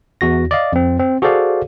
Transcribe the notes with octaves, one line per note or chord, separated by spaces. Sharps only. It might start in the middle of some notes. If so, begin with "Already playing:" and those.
E2 F#4 A#6
D5 D#5 F5
F2 C4
C4
F#4 G#4 A4 C5 D5 F5